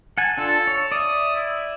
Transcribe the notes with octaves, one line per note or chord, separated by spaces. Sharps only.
F#5 G#5 A5
D4 F4 A4 A5
C#5
D5 E5 D#6
E4